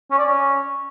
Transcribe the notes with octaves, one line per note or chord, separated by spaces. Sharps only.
C#4
D5
C#4